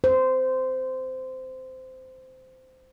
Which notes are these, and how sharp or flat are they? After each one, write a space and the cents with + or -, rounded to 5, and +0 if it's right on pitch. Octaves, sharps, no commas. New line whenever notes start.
C5 -15